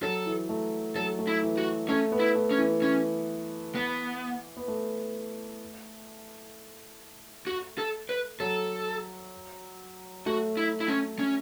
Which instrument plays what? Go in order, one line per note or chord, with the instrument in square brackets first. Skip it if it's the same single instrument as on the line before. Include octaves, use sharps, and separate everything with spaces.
[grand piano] F#3 [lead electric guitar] A4
[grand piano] E3
A3
[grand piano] F#3 [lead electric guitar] A4
[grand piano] A3
[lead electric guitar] E4
[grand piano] E3
[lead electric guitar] F#4
[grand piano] A3 [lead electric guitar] C#4
[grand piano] B3
[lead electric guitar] E4
[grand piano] A3
[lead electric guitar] C#4
[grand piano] E3
[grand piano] E3 [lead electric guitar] C#4
[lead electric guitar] B3
[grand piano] B3
A3
[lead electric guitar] F#4
A4
B4
[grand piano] F#3 [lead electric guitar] A4
[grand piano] A3 [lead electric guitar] F#4
[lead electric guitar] E4
E4
C#4
C#4